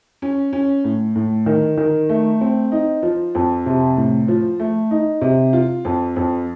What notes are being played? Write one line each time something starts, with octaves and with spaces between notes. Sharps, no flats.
C#4
C#4
A2
A2
D#3
D#3
A3
C4
D#4
F3
F2
C3
A2
F3
A3
D#4
C3
F4
F2
F2